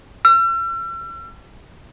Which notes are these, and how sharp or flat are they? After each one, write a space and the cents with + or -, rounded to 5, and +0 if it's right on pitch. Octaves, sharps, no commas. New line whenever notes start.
E6 +45